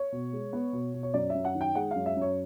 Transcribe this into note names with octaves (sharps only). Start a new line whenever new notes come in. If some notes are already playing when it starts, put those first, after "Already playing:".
Already playing: C#5
B2
G#3
B3
B2
B2
C#5
F#2 D5
E5
F#2
F#5
D#3
G5
G#3 F#5
F#2 F5
E5
F#2
C#5